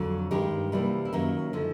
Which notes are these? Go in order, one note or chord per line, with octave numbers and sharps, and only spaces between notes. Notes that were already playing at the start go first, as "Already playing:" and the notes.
Already playing: F2 D3 F#3
G2 D#3 G#3 G4
C3 E3 G3 A#3
E4
F#2 D#3 F#3 A#3 D#4
D3 F3 G#3